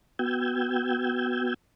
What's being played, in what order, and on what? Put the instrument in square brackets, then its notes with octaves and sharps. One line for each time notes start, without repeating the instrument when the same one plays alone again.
[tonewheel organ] B3 F#4 G5 E6 G6 G#6